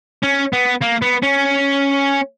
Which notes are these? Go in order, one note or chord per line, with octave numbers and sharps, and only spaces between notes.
C#4
B3
A#3
B3
C#4